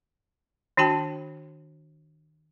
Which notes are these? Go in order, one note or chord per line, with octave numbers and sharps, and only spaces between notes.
D#3 D4 F#4 G5 A5